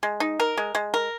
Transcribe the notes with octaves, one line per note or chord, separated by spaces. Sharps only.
G#3
D#4
A#4
G#3
G#3
A#4